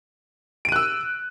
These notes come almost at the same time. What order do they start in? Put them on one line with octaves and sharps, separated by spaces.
D7 D#7 F#6 E6